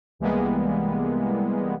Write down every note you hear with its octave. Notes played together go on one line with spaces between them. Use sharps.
C2 E3 G3 G#3 A#3 B3